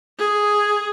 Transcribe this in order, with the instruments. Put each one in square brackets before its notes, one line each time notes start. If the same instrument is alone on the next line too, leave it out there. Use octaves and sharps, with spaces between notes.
[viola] G#4